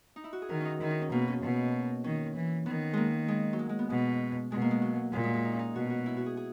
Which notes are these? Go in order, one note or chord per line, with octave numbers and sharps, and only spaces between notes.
D#4
E4
F#4
G#4
D#3 A#4
C#4 D#4
D#3 E4
D#4
C#4
B2 A#3
C#4
B2
D#3 C#4
E3
D#3 B3
G#3 A#3
G#3
F#3
G#3
G#3
B3
B2 G#3
B2 G#3
A#3
G#3
F#3
A#2 G#3
G#3
G#3
D#4
C#4
D#4
B2 F#4
F#4
E4
F#4
G#4
G#4